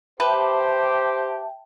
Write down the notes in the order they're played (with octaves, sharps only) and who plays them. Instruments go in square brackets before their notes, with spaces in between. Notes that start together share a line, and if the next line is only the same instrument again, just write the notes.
[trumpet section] G4 [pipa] B4 [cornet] C5 [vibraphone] E5 G5 A5